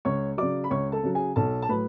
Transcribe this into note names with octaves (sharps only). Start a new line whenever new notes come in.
C#2 C#5 C#6
C#3 F#3 D5 D6
B5
C#2 C#5 C#6
A4 A5
C#3 F#3
G#4 G#5
B1 A4 A5
A5
A2 F#3 B4 B5